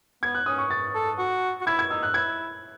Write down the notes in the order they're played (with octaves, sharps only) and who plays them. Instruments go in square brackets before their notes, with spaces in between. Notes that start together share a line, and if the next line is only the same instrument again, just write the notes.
[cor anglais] B3 [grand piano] G#6
[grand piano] F#6
[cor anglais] C#4 [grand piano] D#6
[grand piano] C#6
A6
[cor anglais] A4
F#4
F#4
[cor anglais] E4 [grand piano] G#6
[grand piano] G#6
[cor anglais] D#4 [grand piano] E6
[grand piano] F#6
[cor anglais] E4 [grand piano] G#6